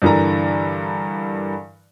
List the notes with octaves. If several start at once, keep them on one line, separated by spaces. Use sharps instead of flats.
G2 D3 E3 A#4 A#5